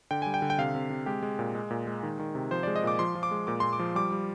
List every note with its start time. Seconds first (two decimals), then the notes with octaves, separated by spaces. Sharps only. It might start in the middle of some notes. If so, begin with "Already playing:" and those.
0.11 D3 G5
0.22 G3 G#5
0.34 G5
0.42 D3
0.50 G5
0.58 C3 F5
0.75 C3
0.90 C3
1.06 G#3 G4
1.23 G#3
1.39 A#2
1.55 G#3
1.71 A#2
1.87 G#3
2.03 D#3
2.19 D#3
2.35 C3
2.51 F3 C5
2.63 G#3 D5
2.76 D#5
2.84 A#2 D6
2.99 F3 C6
3.15 F3
3.23 D6
3.31 G#3
3.47 A#2 D6
3.60 A#2 C6
3.73 D6
3.79 F3
3.96 G3 D6
4.12 G3